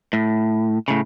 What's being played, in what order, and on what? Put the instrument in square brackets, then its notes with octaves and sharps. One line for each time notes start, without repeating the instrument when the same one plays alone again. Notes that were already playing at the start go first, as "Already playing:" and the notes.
[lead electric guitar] A2
A2 C#3